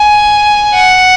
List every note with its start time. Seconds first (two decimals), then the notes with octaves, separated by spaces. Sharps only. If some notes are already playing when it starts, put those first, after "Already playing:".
Already playing: G#5
0.75 F#5